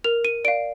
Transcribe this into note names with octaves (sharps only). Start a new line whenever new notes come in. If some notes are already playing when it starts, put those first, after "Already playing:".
A#4 F7
D#7
D5 F5 D7